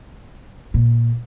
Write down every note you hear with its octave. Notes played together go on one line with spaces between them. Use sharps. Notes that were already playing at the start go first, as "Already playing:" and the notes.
A#2